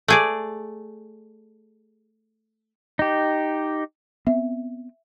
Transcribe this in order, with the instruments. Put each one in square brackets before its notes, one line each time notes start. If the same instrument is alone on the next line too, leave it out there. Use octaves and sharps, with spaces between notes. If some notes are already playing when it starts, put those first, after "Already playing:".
[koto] A3 G#4 D5
[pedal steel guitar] D#4 G4
[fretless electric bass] B3 C4 [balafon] E5